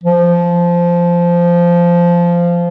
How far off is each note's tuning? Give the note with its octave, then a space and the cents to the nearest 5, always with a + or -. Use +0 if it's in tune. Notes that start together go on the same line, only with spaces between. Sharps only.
F3 -10